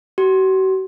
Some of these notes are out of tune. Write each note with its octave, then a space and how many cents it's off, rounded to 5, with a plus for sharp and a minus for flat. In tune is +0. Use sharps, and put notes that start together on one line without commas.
F#4 +45